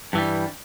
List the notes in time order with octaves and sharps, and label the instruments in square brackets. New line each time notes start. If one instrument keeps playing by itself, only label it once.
[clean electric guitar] G2 E3 G3